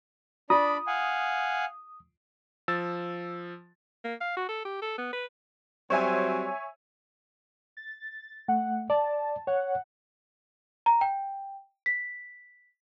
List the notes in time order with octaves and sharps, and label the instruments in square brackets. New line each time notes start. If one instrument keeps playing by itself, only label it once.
[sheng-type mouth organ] D4 D5 B5 [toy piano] F4 [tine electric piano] D#6
[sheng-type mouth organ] F5 F#5 G#5
[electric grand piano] F3 E6 A6
[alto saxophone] A#3
F5
F#4
A4
G4
A4
B3
B4
[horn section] F#3 G3 C4 [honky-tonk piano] C#5 E5 G#5
[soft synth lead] A6
[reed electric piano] A3 [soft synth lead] F#5
[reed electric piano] D5 [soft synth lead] A5
[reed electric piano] C#5 [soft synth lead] F#5
[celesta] A#5
G5
B6